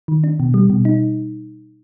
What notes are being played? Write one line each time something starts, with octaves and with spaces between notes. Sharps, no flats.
D#3
D4
B2
G3
B2
D#4